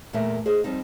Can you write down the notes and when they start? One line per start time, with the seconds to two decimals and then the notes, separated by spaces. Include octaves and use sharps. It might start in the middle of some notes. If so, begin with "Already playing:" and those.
0.13 E2 A#2 A3 A#4 E5
0.46 G#4 C5 D#5
0.64 F3 G3 C4 D#4